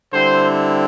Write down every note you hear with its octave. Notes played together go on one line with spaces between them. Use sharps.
D3 G3 C4 E4 C5